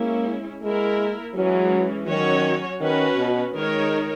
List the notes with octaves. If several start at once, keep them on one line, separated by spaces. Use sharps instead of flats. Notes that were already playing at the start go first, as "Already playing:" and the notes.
Already playing: G#3 A#3 C#4 E4
G#3 A#3 E4 A#4
E3 F#3 G#3 C#4
D#3 F#3 C#4 F#4 C#5
D#3 C#4 F#4 B4
B2
D#3 G#3 D#4 A#4 C#5